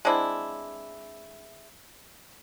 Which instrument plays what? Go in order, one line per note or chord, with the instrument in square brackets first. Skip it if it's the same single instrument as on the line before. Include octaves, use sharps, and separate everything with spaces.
[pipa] G#3 C4 D4 E4